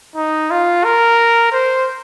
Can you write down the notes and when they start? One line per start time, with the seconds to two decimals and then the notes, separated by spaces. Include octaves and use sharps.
0.16 D#4
0.51 F4
0.84 A#4
1.52 C5